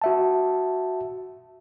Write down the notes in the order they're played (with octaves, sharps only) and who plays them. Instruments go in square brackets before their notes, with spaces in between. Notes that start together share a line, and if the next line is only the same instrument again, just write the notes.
[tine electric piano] F#4 E5 A5